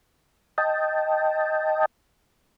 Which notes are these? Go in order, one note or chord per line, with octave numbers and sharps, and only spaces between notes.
D#5 G5 A5